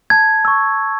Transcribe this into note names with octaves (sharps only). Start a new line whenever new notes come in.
A5 G#6
C#6 E6